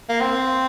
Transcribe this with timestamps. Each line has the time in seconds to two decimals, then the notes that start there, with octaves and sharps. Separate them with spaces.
0.09 A#3
0.20 C4